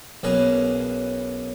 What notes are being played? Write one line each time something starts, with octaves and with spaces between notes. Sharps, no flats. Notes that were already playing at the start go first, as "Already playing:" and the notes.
B1 A#3 C#4 G#4 B4 A#5